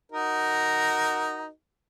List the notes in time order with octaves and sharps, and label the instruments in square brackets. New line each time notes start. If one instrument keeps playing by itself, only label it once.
[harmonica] D#4 F#4 A#4